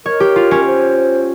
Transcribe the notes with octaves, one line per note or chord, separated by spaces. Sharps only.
A#4 C#5
G4
F4
C#4
C5